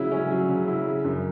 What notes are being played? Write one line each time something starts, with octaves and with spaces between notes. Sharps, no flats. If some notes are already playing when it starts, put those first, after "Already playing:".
Already playing: C#3 F#3 C#4 E4
C#4
F#3
C#3
E4
C#3
F#2